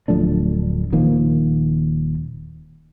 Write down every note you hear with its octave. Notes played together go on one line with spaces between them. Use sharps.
D1 F3 A3 D4
D#1 D#3 F3 A#3